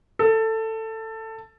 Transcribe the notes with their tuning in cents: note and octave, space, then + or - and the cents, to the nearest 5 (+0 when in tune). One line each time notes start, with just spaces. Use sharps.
A4 +15